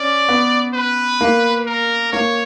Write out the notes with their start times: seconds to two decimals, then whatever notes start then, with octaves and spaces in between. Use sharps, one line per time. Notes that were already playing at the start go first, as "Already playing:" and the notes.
Already playing: C#4 D5
0.28 B3
0.74 B4
1.21 A#3
1.66 A#4
2.12 A#3 C#5